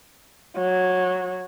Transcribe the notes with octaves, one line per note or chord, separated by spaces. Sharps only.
F#3